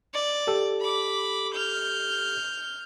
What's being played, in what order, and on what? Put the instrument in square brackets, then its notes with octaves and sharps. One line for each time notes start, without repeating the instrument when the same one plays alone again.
[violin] D5
[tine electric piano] G4 A4
[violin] B5 D6
F6 G6